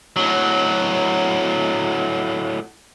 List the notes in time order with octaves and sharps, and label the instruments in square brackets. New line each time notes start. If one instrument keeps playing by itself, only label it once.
[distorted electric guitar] A2 F#3